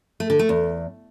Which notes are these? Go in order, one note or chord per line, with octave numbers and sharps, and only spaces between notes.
A3
D3
A3
E2